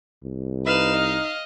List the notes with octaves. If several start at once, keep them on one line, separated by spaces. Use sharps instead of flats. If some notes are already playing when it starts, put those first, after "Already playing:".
C2
D#4 B4 F5 E7
D#5